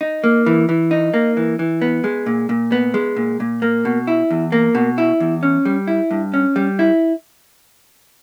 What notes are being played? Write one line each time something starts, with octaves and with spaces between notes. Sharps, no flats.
D#4
A#3
E3
E3
D#4
A#3
E3
E3
B3
G#3
A#2
A#2
B3
G#3
A#2
A#2
A#3
B2
E4
E2
A#3
B2
E4
E2
C#4
G3
E4
G2
C#4
G3
E4